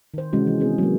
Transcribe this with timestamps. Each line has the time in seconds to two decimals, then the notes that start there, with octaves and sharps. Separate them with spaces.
0.14 D#3 C5
0.33 C3 E3 G#3 C#4 F#4
0.47 E3
0.60 B3 C4 G#4
0.78 F#3 A#3